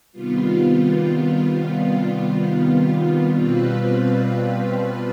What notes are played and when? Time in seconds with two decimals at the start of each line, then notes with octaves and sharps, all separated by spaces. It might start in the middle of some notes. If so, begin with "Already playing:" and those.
0.12 C3 D#3 G3 B3 F4
3.33 B2 G3 C4 F4 B4